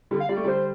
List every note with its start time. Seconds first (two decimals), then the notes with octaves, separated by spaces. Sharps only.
0.11 D3 G3
0.20 F5
0.29 G3 D5
0.37 A3
0.44 D3 G3 C5